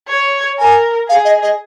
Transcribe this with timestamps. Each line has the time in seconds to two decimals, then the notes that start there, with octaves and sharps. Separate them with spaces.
0.09 C#5
0.59 A#4 G#5
1.08 G#4 F5
1.25 D#5
1.42 D#5